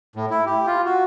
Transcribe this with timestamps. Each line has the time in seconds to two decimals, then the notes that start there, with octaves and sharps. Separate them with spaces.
0.16 A2
0.30 E4
0.46 G4
0.67 F4
0.85 F#4